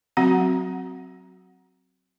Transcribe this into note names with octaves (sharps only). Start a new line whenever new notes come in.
F#3 C4 F#4 F#5